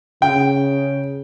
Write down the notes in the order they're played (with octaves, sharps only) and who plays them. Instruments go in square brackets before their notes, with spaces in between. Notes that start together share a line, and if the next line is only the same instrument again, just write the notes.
[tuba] C#3 [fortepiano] G5